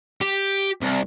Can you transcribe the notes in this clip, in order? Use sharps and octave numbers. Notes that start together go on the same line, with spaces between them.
G4
C2